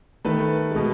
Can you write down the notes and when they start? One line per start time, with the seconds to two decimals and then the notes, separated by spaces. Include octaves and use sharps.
0.25 D#3 A3 B4
0.71 B2 G#3